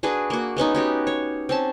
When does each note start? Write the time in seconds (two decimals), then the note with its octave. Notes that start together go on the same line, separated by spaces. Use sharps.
0.03 D4 F#4 G#4 B4
0.30 A#3 F#4
0.56 G#3 B3 C#4 D#4
0.75 C#4 F#4 G4
1.07 C#5
1.49 C4 C#4 A5